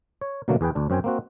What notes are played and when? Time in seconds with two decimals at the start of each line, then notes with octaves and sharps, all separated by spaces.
0.21 C#5
0.48 B2 D3 F#3 A3 A#3
0.61 E2 G#4 B4 G5
0.75 D2 D4
0.90 F#2 C4 G5 G#5
1.04 A#3 C4 F#4